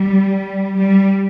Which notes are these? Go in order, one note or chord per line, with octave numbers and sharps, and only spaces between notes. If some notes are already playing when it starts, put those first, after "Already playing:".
Already playing: G3
G3